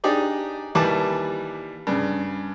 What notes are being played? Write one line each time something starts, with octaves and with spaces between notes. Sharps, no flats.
D4 D#4 G4 G#4 D5 D#5
D#2 E3 G3 B4 A5 D6
G2 C#3